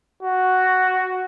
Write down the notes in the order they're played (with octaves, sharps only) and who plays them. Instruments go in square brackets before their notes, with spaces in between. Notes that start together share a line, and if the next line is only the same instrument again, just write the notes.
[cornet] F#4